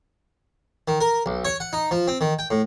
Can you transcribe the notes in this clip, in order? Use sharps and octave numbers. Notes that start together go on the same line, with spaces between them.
D#3
A#4
B1
C#5
F#5
D#4
F3
C4
D#3
G5
A2